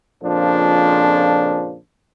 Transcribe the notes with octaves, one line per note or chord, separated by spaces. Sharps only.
F2 A#2 C#3 F3 D4